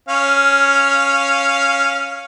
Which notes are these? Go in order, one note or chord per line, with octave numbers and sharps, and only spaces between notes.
C#4 F5